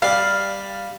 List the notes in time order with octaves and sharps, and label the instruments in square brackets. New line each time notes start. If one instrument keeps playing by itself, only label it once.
[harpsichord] G3 D5 [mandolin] F5